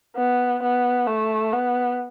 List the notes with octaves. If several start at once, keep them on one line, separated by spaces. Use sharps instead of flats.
B3
B3
A3
B3